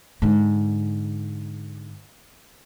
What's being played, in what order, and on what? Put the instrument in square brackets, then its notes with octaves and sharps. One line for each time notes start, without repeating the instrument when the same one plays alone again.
[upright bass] G#2 D3